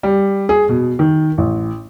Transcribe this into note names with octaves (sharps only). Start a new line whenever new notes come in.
G3
G#4
B2
D#3
A1